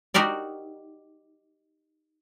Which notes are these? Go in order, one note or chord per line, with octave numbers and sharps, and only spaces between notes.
D#4 F#4 G4 A#4 D5